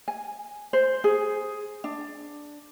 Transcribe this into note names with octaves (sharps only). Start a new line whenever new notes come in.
G#5
C5
G#4
D4